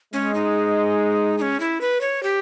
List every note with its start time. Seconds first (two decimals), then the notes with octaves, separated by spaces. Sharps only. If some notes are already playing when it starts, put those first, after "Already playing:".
0.13 G#3 C#4
0.34 D#4
1.38 D#4
1.41 C#4
1.60 E4
1.81 B4
2.01 C#5
2.23 G4